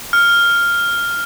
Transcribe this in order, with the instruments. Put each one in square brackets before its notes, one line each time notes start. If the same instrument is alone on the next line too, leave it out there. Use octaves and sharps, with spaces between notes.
[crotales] F6